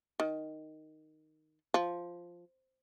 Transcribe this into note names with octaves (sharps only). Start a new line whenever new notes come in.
D#3
F3